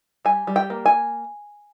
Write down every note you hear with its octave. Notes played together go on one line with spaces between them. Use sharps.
G3 G#5
G3
G5
A#3
G#5